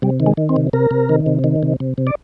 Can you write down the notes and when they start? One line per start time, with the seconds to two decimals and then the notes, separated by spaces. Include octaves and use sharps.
0.02 C3 G3
0.20 D#3
0.26 G#3
0.37 D#3
0.49 C4
0.56 C3
0.73 C3 A#4
0.91 C3
1.09 D#3
1.26 C3
1.44 D#3
1.63 C3
1.80 C3
1.98 C3
2.07 D5